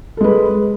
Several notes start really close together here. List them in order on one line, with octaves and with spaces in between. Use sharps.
A4 G#3 B4